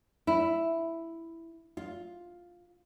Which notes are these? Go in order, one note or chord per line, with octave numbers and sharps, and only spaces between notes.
E4
F4